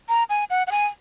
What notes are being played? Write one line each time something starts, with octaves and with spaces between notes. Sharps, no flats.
A#5
G#5
F#5
F#5
G#5